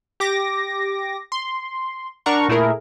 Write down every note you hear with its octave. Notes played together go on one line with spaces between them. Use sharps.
G4 D6 A#6
C6
D4 A#4 F#5 A#5 C#6
A#2 A3 E4 G#4 A#4